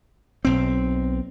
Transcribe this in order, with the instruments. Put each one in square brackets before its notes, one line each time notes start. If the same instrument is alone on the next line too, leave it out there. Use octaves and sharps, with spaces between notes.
[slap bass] B1 C4